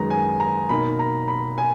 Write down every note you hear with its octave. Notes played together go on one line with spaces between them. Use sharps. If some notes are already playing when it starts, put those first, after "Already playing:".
Already playing: F#2 D#3 G#3 B3 A#5
G#5
A#5
B2 A#3 D#4 B5
A#5
B5
G#5